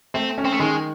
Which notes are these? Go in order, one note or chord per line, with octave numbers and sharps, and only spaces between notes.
A3 C4
C#4
C4
A3
D#3 G#3